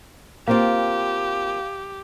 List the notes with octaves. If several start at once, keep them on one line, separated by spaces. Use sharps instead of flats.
A#3 C4 F4 G4 F5